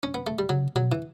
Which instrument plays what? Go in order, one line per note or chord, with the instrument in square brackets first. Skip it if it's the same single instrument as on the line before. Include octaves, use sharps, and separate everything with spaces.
[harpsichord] C#4
B3
A3
G3
[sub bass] C#3 [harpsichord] F#3
[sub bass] B2 [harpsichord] F#3
[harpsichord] E3